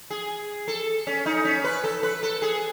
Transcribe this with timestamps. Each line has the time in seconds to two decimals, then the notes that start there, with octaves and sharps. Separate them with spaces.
0.10 G#4
0.68 A4
1.07 C#4
1.26 D#4
1.45 C#4
1.64 B4
1.84 A4
2.03 B4
2.23 A4
2.42 G#4